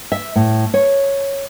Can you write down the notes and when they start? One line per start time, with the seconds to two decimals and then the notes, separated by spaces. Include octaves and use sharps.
0.12 E5
0.36 A2
0.74 C#5